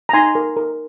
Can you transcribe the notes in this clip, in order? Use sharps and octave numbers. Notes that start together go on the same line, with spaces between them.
A#5
D#4 G#5 C6
A#4
A#4